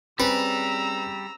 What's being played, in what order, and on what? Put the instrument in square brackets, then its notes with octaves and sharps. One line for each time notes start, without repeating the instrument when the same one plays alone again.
[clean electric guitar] G3 [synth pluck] C4 C#4 G#4 [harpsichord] B4 [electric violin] A#5 E6